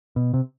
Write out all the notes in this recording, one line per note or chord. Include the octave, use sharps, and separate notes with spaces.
B2
C3